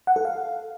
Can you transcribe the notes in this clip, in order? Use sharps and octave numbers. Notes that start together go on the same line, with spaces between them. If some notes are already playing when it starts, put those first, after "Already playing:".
F#5
A4
F5